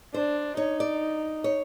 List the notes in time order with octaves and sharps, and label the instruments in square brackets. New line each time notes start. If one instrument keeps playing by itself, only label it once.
[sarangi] D4 [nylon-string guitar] C5
[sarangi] D#4 [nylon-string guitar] C#5
[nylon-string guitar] D5
C#5